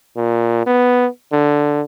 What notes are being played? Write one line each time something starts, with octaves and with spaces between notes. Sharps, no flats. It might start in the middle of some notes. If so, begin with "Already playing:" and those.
A#2
B3
D3